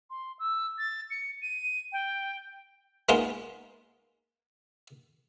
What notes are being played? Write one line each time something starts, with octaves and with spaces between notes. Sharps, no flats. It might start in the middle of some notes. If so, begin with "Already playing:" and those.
C6
E6
A6
C#7
D#7
G5
G#3 A#3 B3 D#4 F4